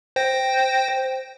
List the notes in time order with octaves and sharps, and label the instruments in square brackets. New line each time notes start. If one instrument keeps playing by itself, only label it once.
[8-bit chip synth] C5 G5 A#6